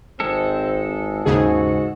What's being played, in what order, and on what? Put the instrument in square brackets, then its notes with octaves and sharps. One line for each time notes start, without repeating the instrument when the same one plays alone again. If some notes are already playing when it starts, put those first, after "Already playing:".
[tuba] G#1 [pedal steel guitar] G#3 A4 [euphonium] C4
[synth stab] D#2 C#3 G#4 [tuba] G#2 [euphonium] F#4